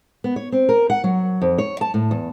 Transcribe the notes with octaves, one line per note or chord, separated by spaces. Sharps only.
B3
C#5
C4
A#4
F#5
F#3
F2
C#5
A5
A2
E2